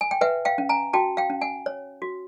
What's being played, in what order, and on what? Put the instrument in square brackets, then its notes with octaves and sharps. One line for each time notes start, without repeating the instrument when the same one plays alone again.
[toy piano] G#5
G5
B4 E5 F#5
F5 G5
C#4
G#5 A#5
F#4 G5 A5
F5 G5
C#4
F#5 G#5
C#5
F#4